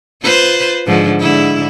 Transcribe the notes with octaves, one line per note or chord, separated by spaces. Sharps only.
F4 B4 C5
G#2 D3 F3
G#2 D3 E4